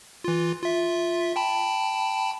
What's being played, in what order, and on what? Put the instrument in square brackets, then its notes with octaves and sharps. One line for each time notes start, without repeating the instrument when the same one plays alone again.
[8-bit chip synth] E3 F4
F4 E5
G5 A5 B5